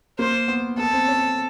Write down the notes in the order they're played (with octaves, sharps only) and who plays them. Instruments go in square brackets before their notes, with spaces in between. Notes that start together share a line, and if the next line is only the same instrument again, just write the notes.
[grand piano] A#3 [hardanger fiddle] C5
[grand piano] B3
[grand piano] B3 [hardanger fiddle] A4
[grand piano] C4
C#4